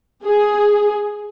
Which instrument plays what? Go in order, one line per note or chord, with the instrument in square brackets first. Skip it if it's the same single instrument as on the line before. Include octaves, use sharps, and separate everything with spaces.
[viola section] G#4